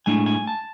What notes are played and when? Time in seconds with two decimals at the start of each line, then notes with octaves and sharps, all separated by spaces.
0.06 A2 G#3 D4 G#5
0.26 G#5
0.47 A5